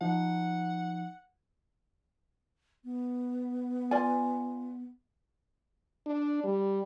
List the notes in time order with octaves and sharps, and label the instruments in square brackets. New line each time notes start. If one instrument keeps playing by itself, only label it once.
[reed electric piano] F3 D#4 [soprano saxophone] F#5
[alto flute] B3
[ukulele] F4 D5 G#5
[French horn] D4
G3